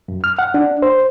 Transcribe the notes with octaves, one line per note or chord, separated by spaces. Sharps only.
F#2
F6
F#5
D4
C5